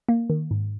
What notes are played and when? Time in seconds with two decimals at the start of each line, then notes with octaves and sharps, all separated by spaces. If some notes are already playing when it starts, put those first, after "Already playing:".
0.08 A#3
0.30 D#3
0.51 G#2